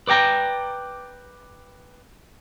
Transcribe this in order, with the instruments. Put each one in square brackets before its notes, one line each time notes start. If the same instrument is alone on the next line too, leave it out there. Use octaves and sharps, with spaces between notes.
[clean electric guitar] B4 D5 G5 A#5